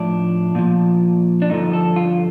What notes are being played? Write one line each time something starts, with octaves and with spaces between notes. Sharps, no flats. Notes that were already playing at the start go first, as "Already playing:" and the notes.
Already playing: A2 F3 D4
A#2 F3
D4
G2 D3 F3 D#4
A4
F4